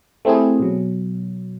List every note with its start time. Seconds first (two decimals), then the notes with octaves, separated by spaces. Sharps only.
0.25 A3 C4 E4 G4 G#4
0.60 B2 F#3